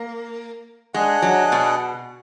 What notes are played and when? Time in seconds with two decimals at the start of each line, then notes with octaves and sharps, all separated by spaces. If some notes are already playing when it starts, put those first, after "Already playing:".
Already playing: A#3
0.94 G#3 D4 G#4 D#5 F#5
1.22 F#3
1.52 B2